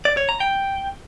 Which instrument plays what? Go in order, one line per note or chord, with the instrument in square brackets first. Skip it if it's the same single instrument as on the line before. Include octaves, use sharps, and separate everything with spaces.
[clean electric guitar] D5
C#5
A#5
G5